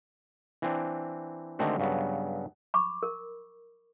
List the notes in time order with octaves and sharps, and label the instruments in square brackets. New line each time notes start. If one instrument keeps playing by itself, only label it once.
[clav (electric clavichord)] E3 C4 D4
D3 D#3 G#3 A3 C4 F#4
G2 C#3 F#3 B3
[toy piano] B5 C#6 D6
A#4